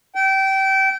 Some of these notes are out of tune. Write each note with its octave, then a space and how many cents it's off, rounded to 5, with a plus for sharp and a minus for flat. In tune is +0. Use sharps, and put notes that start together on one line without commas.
G5 -25